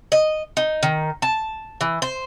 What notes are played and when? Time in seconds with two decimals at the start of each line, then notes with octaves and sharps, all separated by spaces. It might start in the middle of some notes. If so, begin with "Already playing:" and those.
0.12 D#5
0.57 D#4
0.83 D#3
1.22 A5
1.81 E3
2.02 C5